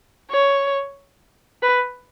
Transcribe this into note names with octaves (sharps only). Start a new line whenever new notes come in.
C#5
B4